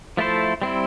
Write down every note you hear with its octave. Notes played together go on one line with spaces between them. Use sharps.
F3 A3 E4 A4 C5
G3 C4 E4